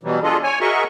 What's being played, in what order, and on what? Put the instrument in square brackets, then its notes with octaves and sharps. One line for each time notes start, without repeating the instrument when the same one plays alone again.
[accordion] B2 E3 F#3 G3
D4 F4 G#4 A4 D#5
C#5 G#5
F#4 G#4 A#4 D#5 E5 C#6